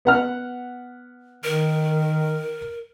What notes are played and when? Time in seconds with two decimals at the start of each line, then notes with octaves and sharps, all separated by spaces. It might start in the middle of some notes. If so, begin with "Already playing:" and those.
0.05 B3 F#5 F6
1.44 D#3 A#4